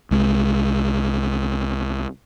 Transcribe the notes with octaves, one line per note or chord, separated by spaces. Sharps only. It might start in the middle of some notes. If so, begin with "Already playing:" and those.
C2 G#3